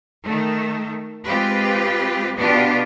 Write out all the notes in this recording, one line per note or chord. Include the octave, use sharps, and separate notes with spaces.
D#3 A3
G#3 C4 F4 G4 B4
B2 B3 D4 F4 G4